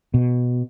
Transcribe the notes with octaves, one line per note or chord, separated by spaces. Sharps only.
B2